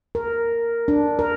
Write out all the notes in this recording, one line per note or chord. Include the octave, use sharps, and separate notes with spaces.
A#4
D4
A#4